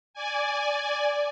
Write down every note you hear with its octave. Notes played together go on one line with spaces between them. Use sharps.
D5 G#5